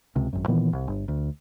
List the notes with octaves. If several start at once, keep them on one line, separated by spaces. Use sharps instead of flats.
C#2 C3
G#1 F#2
A#2 D#3 E3 B3
C2
G1
D2